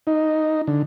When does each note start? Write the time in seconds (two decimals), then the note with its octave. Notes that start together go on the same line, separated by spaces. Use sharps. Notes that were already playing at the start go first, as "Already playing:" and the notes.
0.07 D#4
0.67 D3